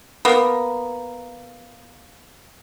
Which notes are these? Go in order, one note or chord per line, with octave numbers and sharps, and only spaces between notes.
A#3 B3